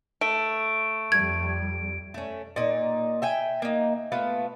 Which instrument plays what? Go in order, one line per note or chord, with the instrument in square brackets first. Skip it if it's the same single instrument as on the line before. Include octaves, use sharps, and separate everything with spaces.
[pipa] A3 [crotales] D7
[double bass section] F2 G3 [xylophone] G#6
[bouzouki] A3 C#4
A#2 D#4
E5 G5 G#5
A#3 D#4
A3 B3 F4